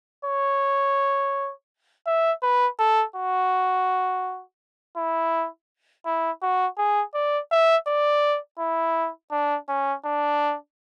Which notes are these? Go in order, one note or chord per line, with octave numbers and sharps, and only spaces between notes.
C#5
E5
B4
A4
F#4
E4
E4
F#4
G#4
D5
E5
D5
E4
D4
C#4
D4